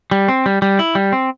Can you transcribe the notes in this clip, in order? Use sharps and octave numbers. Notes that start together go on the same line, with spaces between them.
G3
C4
G3
G3
E4
G3
C4